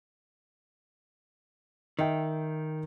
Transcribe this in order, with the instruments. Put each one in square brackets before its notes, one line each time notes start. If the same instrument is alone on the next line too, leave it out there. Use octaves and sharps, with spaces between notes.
[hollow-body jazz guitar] D#3 [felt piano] D#5 E5 G5